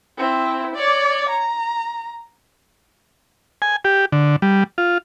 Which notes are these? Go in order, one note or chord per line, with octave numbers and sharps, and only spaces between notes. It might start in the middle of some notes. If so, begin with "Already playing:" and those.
C4 E4
C#5 D5
A#5
G#5
G4
D3
G3
F4